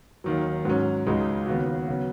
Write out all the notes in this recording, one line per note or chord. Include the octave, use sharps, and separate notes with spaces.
D#2 D#3 F#3
G#2 F#3 C#4
C#2 C#3 G#3 D#4 F#4
D#2 C#3 B3 F#4
C#3 F#3 B3